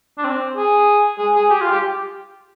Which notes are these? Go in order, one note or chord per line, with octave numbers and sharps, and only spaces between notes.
D4
C4
G#4
G#4
G#4
G4
F4
G4